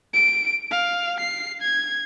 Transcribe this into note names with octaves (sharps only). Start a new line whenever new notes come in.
D7
F5
C7
G#6